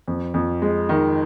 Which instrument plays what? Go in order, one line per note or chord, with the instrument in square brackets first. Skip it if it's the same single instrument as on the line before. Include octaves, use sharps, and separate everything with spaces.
[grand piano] F2
F2
G#3
D#3